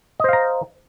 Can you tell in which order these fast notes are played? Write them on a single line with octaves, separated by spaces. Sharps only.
D#5 C5 F5 A#5